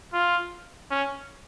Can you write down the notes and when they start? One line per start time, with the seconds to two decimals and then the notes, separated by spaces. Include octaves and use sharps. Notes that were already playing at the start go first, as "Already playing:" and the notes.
0.13 F4
0.91 C#4